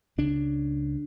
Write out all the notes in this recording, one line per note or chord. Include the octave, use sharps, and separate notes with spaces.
C#2 C#3 D4